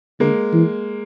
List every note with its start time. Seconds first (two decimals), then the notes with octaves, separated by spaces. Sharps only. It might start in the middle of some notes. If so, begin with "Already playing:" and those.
0.20 D3 G#3 A#3
0.53 E3